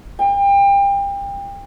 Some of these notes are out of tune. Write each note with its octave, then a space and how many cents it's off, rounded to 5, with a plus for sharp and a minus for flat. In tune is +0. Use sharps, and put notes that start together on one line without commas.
G5 +30